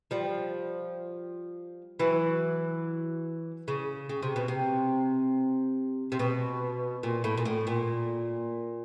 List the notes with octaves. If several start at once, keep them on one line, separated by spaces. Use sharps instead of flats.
F3 G3
E3 F#3
C#3
C#3
C3
B2
C3
C3
B2
A#2
A2
A#2
A2
A#2